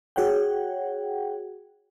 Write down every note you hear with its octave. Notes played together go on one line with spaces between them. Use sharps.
F#4 G#4 C#5 F#5 G5